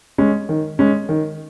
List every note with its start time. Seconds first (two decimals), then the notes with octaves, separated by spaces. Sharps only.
0.18 G#3 C#4
0.49 D#3
0.79 G#3 C#4
1.09 D#3